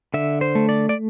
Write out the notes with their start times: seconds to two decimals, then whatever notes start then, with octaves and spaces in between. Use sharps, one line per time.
0.14 D3 E5
0.41 C5
0.55 A3
0.69 D5
0.89 D5